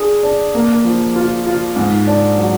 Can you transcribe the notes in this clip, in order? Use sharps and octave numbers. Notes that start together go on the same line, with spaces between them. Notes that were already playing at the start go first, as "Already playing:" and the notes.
Already playing: D4 G#4
D4
A#3
F3
F4
F4
G#2
D4
F#3